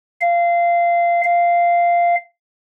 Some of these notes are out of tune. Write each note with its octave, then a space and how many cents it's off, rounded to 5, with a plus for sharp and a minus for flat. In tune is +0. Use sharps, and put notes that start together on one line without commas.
F5 -20
F5 -10